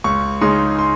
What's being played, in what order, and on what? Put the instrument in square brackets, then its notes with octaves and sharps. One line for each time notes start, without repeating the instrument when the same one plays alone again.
[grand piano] C#2 C#6
C#3 G#3 D#4 C6
C6